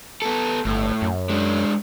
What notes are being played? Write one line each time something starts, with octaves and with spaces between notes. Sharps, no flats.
B3 A4
G1 A2
F#2
G#3 D4